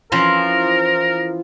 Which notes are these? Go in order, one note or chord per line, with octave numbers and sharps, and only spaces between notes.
E3 F3 C#4 A#4